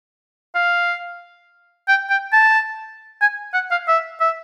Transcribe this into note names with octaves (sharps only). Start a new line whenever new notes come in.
F5
G5
G5
A5
G#5
F#5
F5
E5
E5